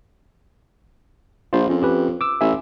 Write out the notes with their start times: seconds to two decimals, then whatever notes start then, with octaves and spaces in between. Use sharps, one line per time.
1.53 A#1 F4 C5
1.69 F2 C#4
1.82 C#4 G4 B4
2.21 D6 E6
2.41 A1 E5 G#5 E6